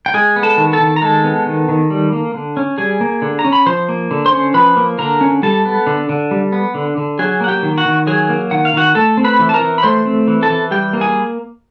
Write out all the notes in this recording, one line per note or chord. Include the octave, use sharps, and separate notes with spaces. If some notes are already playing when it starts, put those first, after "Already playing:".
G5
G#3 G#4 G#5
B3
A4 A5
D#3
A4 A5
D#3
A#5
G#3 A4 A5
B3
D#3
D#3
G3
A#3
D3
C#4
G3 G#4 G#5
A#3
D3
A#5
C#4
B5
F3 C5 C6
A#3
D3
C5 C6
C#4
F3 B4 B5
A#3
D3 A#4 A#5
C#4
G3 A4 A5
B3
D3
D3
G3
B3
D3
D3
F#3 G#4 G#5
A#3 F#5
G4 G5
D#3
F#4 F#5
D#3
F#3 G#4 G#5
A#3
D#3 F#5
F5
D#3 F#4 F#5
A3 A4 A5
C4
B4 B5
E3
A5
A#4 A#5
E3
B5
A3 C5 C6
C4
E3
A4 A5
E3
G3 G4 G5
A#3
G#4 G#5